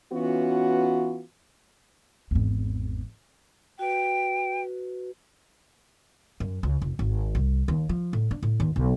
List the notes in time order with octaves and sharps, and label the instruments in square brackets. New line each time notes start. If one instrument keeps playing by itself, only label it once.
[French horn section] E3 B3 C#4 F4 F#4
[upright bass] G#1 E2
[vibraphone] F#4 B4 [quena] G5
[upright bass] F#2
C#2
F1
G#1
C2
D#2
F3
A2
D4
A2
D#2
B1